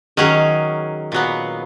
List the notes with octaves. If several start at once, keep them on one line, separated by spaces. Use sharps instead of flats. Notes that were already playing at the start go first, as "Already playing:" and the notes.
D#3 F#3 C#4 G#4
A#2 F#3 B3